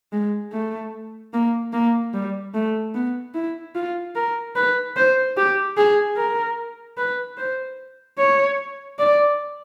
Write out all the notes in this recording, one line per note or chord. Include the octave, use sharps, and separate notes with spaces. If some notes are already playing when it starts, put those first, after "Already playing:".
G#3
A3
A#3
A#3
G3
A3
B3
E4
F4
A#4
B4
C5
G4
G#4
A#4
B4
C5
C#5
D5